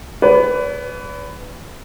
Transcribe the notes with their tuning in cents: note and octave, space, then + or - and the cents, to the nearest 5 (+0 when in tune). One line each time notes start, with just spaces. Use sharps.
B4 +15 D5 -45